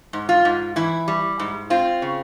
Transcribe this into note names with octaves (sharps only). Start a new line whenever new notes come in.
G#2
F4
G#2
E3 E4
G3
G#2
C4 F4
C#3